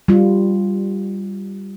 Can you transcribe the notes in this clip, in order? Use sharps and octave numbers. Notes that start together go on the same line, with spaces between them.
G3 F4